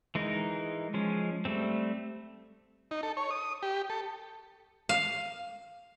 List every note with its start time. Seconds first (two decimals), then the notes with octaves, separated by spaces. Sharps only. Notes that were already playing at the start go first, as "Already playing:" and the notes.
0.15 E3 G#3 D#4 A#4
0.94 F3 G#3 C#4
1.45 G3 A3 C4
2.91 D#4
3.03 A4
3.17 C#5
3.31 D#6
3.63 G4
3.90 A4
4.89 F5